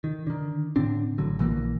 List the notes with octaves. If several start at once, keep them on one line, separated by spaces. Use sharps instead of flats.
D#3
D3 D#3
A2 D3 C4 D4
A1 D3 F#3
A#1 E3 A#3